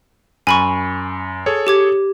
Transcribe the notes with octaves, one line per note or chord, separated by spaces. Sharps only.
F#2 G#5 B5 C#6
G#4 A4 C#5
G4 D6 G#6